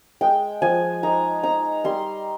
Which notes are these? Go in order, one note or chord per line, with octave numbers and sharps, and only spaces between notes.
G#3 G5
F3 G#5
D#4 A#5
D#4 A#5
G3 C6